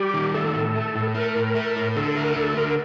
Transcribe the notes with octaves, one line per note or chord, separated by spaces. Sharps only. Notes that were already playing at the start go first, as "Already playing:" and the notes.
Already playing: G3 G4
D#3
A3 A4
A2
A3
A2
A3 A#4
A2
A3
A2
D3 A4
A3 A#4
D3 A4
D3 A#4